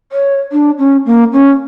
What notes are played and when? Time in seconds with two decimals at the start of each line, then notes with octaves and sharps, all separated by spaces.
0.12 C#5
0.52 D4
0.78 C#4
1.06 A#3
1.33 C#4